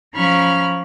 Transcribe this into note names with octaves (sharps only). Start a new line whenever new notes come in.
F3 C#4 A#5 B5 C#6 F6